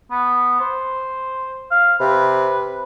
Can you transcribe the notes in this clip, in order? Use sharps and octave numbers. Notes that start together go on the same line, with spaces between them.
B3
C5
F5
C3 B4